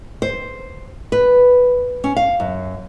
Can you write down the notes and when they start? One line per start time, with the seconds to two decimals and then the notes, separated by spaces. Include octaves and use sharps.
0.22 C5
1.12 B4
2.04 C#4
2.17 F5
2.40 F#2